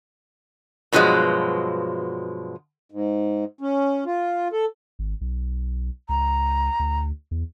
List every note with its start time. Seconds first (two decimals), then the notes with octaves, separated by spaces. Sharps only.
0.92 G2 B2 F3 F#3 G#3
2.91 G#2
3.61 C#4
4.06 F4
4.53 A4
4.99 G#1
5.21 B1
6.09 C#2 A#5
6.79 D2
7.31 E2